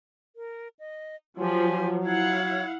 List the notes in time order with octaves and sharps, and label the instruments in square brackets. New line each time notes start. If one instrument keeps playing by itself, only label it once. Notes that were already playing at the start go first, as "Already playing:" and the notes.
[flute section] A#4
D#5
[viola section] F3 [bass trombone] F#3 [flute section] G4 G#5 C6
[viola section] E4 F5 F#5 [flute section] C#5